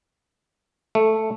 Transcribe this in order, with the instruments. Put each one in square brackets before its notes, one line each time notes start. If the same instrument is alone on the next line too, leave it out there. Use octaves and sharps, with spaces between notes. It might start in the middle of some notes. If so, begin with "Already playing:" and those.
[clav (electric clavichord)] A3